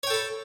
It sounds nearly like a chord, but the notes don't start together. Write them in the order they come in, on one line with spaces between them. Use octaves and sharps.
C#5 G5 A4 B5